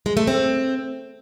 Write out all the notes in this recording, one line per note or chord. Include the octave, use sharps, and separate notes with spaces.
G#3
A3
C4